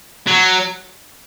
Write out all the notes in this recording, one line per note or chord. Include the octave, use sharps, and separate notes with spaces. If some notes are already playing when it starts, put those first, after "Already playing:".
F#3